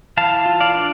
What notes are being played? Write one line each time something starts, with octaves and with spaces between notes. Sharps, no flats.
E3 F5 A5
F4
D5 F5
D4